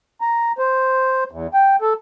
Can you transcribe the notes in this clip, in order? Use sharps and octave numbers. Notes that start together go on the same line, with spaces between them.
A#5
C5
E2
G5
A4